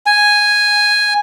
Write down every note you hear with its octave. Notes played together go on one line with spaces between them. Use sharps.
G#5